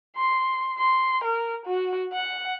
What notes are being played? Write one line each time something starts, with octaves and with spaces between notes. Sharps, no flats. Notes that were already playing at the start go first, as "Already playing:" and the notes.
C6
C6
A#4
F#4
F#5